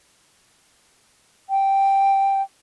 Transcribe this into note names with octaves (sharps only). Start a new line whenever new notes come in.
G5